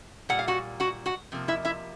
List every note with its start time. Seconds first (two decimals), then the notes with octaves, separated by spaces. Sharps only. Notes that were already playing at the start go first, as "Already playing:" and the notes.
0.29 A#2 G3 A#3 F#5
0.39 F5
0.48 F#4 F#5
0.80 F#4 F#5
1.06 F#4 F#5
1.32 C3 F3 A#3
1.48 E4 E5
1.65 E4 E5